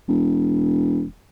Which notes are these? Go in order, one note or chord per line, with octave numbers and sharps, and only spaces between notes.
E1